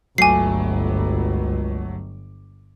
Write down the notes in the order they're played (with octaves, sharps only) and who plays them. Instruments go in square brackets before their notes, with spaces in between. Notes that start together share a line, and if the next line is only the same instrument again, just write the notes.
[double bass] G1 [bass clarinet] C#2 [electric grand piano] F#3 A3 D6 [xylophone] G#5 C7